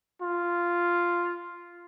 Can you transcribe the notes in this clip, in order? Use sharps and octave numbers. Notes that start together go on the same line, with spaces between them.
F4